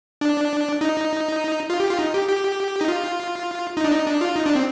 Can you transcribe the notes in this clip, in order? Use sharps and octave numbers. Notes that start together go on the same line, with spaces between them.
D4
D#4
F4
G4
F4
D#4
G4
G4
D#4
F4
D#4
D4
D#4
D4
F4
D#4
D4
C4